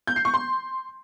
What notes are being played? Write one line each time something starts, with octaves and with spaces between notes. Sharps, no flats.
G6
C7
C#6
C6